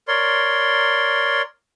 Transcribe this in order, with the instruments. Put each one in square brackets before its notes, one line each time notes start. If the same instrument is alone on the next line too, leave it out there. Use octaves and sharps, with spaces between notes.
[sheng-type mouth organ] A#4 C#5 D5 C6